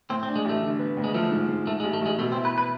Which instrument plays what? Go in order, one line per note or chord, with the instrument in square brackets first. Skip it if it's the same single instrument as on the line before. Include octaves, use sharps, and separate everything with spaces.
[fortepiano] A2 [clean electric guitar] C4
[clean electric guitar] C4
[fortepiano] D4
[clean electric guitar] G#3
[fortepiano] A1 [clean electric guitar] A3
[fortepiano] D3
B3
D2
[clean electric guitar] G#3
[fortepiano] F3 [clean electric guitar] A3
[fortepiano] G#2
G#2
[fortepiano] G#2 [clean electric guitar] A3
[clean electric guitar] G#3
[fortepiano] A1
[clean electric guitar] A3
[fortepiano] A1 [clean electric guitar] G#3
[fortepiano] B2 [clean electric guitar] A3
[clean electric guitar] C4
[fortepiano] E4
[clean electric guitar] B4
B4